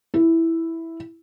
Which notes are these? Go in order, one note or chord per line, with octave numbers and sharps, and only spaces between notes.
E4